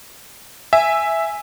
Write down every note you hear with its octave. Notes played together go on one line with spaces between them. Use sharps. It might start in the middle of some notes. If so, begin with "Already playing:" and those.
E5 G#5